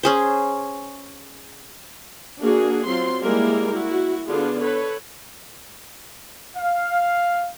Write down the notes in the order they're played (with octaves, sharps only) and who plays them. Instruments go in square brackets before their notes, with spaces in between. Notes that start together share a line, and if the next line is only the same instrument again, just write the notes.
[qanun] C#4 G#4 C5
[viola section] A#3 D4 F#4 G#4
F#3 C4 F4 C6
G3 G#3 A#3 E4 G#4 A#4
E4 F#4
D3 B3 D4 F4 G#4
A4 B4 C#5
[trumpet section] F5